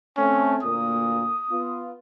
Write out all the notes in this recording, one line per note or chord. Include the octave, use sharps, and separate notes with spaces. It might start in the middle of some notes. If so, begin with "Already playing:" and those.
A3 C4 C#4
D2 A#2 A#3 D#6
B3 F4